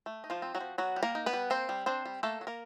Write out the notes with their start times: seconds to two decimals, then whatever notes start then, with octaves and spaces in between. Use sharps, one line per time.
0.06 A3
0.24 D#4
0.30 F3 F4
0.42 C4
0.55 F#3 F#4
0.60 F3
0.78 F#3 B3 F#4
0.96 G3
1.03 A#3 A#4
1.15 D#4
1.26 B3 B4
1.33 G3
1.50 A#3 C4 C5
1.69 G3
1.86 C4 D4 C5
2.05 G3
2.23 A3 A#3 A4
2.41 F#3
2.47 A#3 A#4